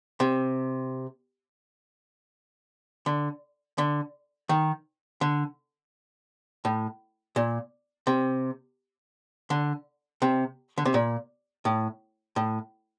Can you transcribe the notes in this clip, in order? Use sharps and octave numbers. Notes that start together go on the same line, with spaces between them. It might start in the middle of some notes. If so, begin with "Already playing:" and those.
C3
D3
D3
D#3
D3
A2
A#2
C3
D3
C3
D3
C3
A#2
A2
A2